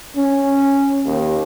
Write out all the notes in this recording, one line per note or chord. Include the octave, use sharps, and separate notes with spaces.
C#4
D#2